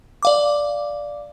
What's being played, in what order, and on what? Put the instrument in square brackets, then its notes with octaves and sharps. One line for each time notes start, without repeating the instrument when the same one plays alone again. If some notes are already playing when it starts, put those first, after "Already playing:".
[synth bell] D5 F5 D6